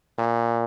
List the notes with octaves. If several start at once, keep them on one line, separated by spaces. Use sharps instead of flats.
A#2